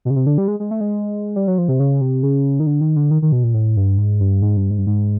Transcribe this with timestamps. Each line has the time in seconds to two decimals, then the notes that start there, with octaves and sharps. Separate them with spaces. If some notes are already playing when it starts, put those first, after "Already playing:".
0.05 B2
0.10 C#3
0.16 C3
0.26 D3
0.38 G3
0.48 G#3
0.60 G#3
0.71 A3
0.81 G#3
1.36 G3
1.47 F#3
1.58 F3
1.68 C3
1.80 C#3
2.01 C3
2.23 C#3
2.60 D#3
2.66 D3
2.81 D#3
2.96 D3
3.11 D#3
3.22 D#3
3.32 B2
3.43 A#2
3.54 A2
3.77 G2
3.98 G#2
4.20 G2
4.42 G#2
4.57 G2
4.71 G#2
4.78 G2
4.87 G#2